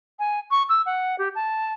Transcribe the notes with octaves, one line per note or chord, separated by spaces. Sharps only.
G#5
C#6
E6
F#5
G4
A5